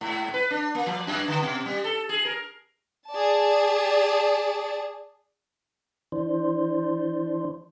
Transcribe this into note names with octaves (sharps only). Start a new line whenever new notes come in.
G#2
B4
D4
A#3
F3
F#2
D3
B2
G3
A4
G#4
A#4
G#4 D5 A5
E3 D4 C5